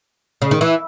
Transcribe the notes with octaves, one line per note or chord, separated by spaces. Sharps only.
C#3
D#3
E3